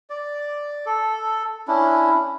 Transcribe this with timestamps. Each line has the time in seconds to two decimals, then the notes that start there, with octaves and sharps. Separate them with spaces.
0.10 D5
0.86 A4
1.68 C#4 D4 E4